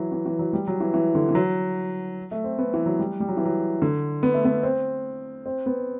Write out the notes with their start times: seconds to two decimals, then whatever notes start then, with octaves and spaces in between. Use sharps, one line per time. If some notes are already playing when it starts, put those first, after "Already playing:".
Already playing: E3 F#3
0.12 E3
0.26 E3
0.39 F#3
0.53 G3
0.67 F#3
0.80 E3
0.94 E3
1.15 D3
1.29 E3
1.35 F#3
2.31 A3
2.44 C4
2.59 B3
2.74 E3
2.86 F#3
2.99 G3
3.20 G3
3.29 F#3
3.37 E3
3.45 F#3
3.82 D3
4.23 B3
4.34 A3
4.45 B3
4.63 C4
5.46 C4
5.66 B3